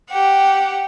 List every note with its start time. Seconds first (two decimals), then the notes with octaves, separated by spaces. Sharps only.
0.10 G4 F#5